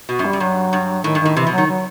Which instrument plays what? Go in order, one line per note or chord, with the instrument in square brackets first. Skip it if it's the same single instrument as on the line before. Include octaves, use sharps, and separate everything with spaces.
[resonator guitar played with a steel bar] B2 [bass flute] F#4
[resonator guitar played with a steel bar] F#2
[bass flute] G3
[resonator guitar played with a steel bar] F#2
[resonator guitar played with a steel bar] G2 [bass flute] F#3
[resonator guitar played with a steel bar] G2
[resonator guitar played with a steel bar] A2 [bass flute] D#3
[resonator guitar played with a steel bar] G2
[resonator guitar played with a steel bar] A2 [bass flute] D#3
[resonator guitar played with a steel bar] C3 [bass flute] E3
[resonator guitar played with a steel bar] B2
[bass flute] F#3
[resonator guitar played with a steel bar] D#3
[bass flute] F#3